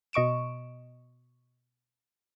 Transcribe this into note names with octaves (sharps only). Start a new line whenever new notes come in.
B2 D#5 C#6 D7 E7